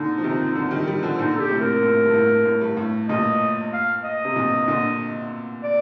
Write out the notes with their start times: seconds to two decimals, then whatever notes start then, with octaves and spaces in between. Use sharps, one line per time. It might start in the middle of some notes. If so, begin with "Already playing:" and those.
Already playing: A#2 D3 D#4
0.18 F3
0.24 C3 D#3
0.55 D3 F3
0.71 D#3 G3
0.87 D#3 G3
1.03 D3 F3
1.18 A#2 D3 D#4
1.35 A4
1.40 G4
1.50 A2 C3
1.61 A#4
1.83 A2
2.06 G2
2.14 A2
2.45 A2
2.61 G2
2.77 A2
3.09 G2 A#2 D#5
3.73 F5
4.04 D#5
4.25 C3
4.36 G2 A#2
4.68 A#2 D3
5.63 D5